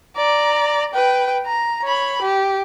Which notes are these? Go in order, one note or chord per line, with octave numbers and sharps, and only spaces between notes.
D5 A#5
B4 G5
A#5
C#5 B5
G4